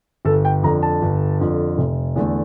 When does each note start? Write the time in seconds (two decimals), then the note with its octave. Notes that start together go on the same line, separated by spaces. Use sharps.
0.25 G1 A4
0.45 G5
0.63 F2 D3 A#5
0.83 A5
1.02 G1
1.40 F2 D3
1.78 F1
2.16 E2 D3 A3